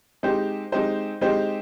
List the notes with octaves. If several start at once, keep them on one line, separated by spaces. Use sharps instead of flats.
G#3 C4 D#4 G4 C5
G#3 C4 D#4 G4 C5
G#3 C4 D#4 G4 C5